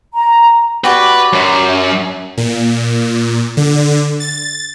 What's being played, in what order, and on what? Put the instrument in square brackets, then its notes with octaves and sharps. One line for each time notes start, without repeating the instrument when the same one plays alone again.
[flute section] A#5
[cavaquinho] F#4 G4 D5 [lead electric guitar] B4
[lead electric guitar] F#2
[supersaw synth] A#2
D3
A6